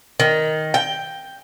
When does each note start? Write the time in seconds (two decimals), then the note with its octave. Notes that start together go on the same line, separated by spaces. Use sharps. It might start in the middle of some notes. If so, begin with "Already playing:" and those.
0.20 D#3
0.74 G5